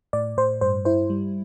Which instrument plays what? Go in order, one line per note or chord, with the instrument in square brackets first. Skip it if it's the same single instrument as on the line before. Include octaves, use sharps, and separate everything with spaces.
[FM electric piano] A2 D5
A2 C5
G2 C5
E4 C5
G3